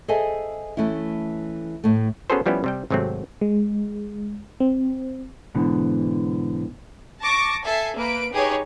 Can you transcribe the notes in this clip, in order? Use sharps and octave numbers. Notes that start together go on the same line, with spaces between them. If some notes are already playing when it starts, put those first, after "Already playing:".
G#4 A4 C5 D#5 E5 G#5
E3 A3 C#4 E4
A2 A3
B3 C#4 F#4 G#4 A4 C5
F3 G3 B3 C#4 E4
C3 G3 G5
G#1 C3 F#3 A3 C4
G#3
C4
G#2 B2 D3 E3
A5 C#6 D6 A#6
A4 E5 G#5 C7
A#3 B4 D7
D#4 G4 G#4 B4 C#5